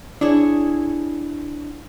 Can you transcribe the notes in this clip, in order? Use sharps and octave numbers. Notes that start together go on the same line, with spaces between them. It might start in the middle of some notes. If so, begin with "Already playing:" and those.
D4 E4 G#4 C#5